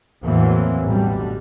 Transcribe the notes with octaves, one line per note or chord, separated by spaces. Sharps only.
E2 A2 E3 F#3 A#3 C4
A1 B2 D3 G3